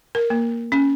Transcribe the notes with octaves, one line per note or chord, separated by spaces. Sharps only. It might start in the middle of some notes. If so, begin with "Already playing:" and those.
A#4
A#3
C#4